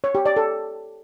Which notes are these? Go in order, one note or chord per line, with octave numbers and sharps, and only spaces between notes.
C#5
G4
D5
A4